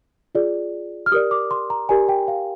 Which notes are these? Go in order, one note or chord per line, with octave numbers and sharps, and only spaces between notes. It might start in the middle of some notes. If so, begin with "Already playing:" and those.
F4 G#4 D5
F6
G4 A#4 D5 D#6
D6
C6
A#5
G4 A#4 D5 G#5
G5
F5